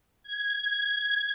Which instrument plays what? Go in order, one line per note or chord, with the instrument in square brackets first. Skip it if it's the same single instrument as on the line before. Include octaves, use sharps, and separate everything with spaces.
[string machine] G#6